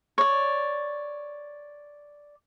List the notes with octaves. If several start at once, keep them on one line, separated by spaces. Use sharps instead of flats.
C#5 D5